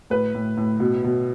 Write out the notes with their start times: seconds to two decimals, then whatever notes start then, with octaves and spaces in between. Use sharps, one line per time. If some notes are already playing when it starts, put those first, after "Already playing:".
0.10 A2 B4
0.35 A2
0.57 A2
0.80 B2
1.04 B2